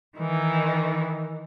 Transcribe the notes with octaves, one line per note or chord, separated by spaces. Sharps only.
D#3 E3